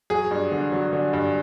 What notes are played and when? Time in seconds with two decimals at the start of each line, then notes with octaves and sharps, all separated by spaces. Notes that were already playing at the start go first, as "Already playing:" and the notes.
0.10 F#3 G#4
0.31 G2
0.52 D3
0.72 F#3
0.93 D3
1.13 G2